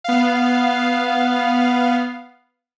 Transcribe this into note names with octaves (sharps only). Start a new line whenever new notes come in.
B3 F5